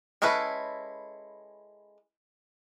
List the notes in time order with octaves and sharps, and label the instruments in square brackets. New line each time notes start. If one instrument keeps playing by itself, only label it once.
[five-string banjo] G#3 C#4 E4 A4 B4